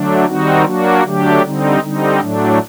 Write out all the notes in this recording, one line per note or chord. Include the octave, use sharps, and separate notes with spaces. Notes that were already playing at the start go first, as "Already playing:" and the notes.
Already playing: D3 F#3 A3 D4
D#3 G3 C4 D#4 F#4
F#3 A#3 D4 F#4
D3 F#3 A3 D4 G4
D3 G3 C4 D#4
D3 G3 C4 D#4
A2 F#3 A3 D4